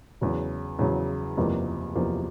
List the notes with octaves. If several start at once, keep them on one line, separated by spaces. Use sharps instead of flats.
E2 C#3 F#3
E2 C#3 F#3
F#1 E2 C3 F3 A#3
F#1 E2 C3 F3 A#3